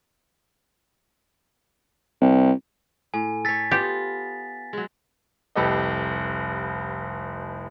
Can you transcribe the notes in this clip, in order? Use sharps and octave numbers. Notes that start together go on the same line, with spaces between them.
C2
A2 G#5
A4 C#5 A6 B6
B3 F4 G4
F#3 G#3
F1 C2 G4 A4 B4 D#5